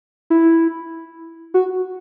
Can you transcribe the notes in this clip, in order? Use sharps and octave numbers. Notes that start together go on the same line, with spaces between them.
E4
F#4